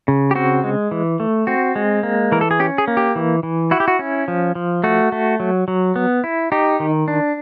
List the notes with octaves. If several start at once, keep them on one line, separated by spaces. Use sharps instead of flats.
C#3
G4
C4 F#4
G#3
E3
A3
C4 F#4
G#3
A#3
E3 A#4
A4
G#4
C#4 G4
G#4
A#3
G4
E3
E3
E4 F#4
G4
F#4
C#4
F3
F3
A3 F#4
A3
F#3
F#3
B3
E4
D#4 G4
D#3
D4